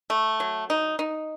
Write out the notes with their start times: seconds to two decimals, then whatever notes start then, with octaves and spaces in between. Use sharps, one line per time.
0.10 A3
0.40 F#3
0.70 D#4
0.99 D#4